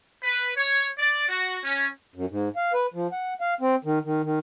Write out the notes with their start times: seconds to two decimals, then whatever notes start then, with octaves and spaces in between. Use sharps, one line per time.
0.23 B4
0.57 C#5
0.99 D5
1.29 F#4
1.65 C#4
2.15 F#2
2.30 G#2
2.56 F5
2.73 B4
2.94 F3
3.12 F#5
3.41 F5
3.61 C4
3.85 D#3
4.04 D#3
4.24 D#3